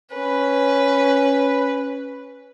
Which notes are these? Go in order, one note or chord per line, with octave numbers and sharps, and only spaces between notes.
C#4 B4